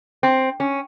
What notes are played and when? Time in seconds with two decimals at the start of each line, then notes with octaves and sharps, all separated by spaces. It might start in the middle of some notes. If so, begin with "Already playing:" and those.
0.23 C4
0.60 C#4